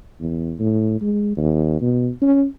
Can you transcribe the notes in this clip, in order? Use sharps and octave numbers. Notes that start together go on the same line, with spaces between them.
E2
A2
G#3
D#2
B2
C#4